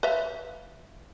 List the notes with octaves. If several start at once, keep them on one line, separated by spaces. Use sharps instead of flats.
B4 E5 F5